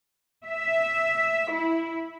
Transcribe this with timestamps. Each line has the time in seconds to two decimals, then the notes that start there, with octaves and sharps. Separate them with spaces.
0.47 E5
1.52 E4